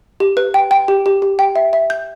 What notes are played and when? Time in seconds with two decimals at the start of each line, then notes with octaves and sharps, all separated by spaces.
0.20 G4
0.37 B4
0.54 G5
0.71 G5
0.88 G4
1.06 G4
1.22 G4
1.39 G5
1.56 E5
1.73 E5
1.90 G6